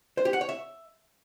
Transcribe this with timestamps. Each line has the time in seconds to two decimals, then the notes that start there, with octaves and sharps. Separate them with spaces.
0.17 C5
0.25 G4
0.33 F#5
0.41 C#5
0.49 E5